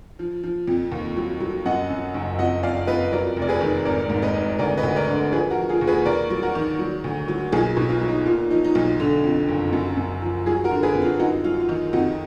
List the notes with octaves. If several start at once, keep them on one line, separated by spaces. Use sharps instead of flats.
F3
F3
F2
D#2
F#3
F#3
F#2 D#5 F#5
F#2
F#1
F2 D#5 F#5
F2 D5 F5
F2 B4 D#5
F#3 A#4 D5
F1
D5
G#4 B4
D#3
G#1 A#4 D5
G#2
B4 D#5
G#1
D2 A#4 D5
B4 D#5
D2
A#4 D5
D3
F3 G#4 B4
F#4 A#4
F3
F4 G#4
D#2
G#4 B4
D#2 A#4 D5
F#3
F#4 A#4
D#3
F#3
D2
F#3
B1 F4 G#4
B2
F4
F#3
D#4
A#2 F4
F3 D#4
D#4
B1 F4
D3
F2
F#1
F#2
F#2
F3
F#3 F4 G#4
F#4 A#4
D3
G#4 B4
F2
F4
F#2 D#4 F#4
F#3 F4
F4
D#3 D#4
F2 D#4 F#4